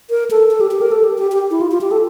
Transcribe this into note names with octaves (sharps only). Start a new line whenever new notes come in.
A#4
A4
A4
G4
G4
A#4
A4
G4
G4
G4
E4
F4
F4
G4
A4